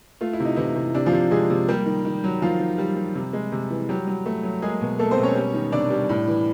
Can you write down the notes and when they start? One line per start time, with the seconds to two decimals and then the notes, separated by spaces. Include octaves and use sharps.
0.21 A3 F4
0.33 E4
0.40 C3 D#4
0.56 C3 E3 E4
0.76 C3
0.94 C3 D4
1.06 F3 F4
1.13 C3
1.31 C3 G#3 G#4
1.50 C3
1.68 G3 A#3 G4
1.86 D#3
2.05 D#3
2.24 F#3
2.42 D#3 F3 F4
2.59 D#3
2.78 G3
2.97 G3
3.15 C3
3.33 G#3
3.52 C3
3.70 E3
3.89 F#3 G3 G4
4.08 F#3
4.26 A3
4.43 F#3
4.62 G#3 A#3 G#4
4.81 B2
4.99 A3 A#3 A4
5.11 C4 C5
5.18 B2
5.23 C#4 C#5
5.35 G3
5.54 D#3
5.72 C3 D4 D5
5.90 G3
6.09 A2
6.28 E3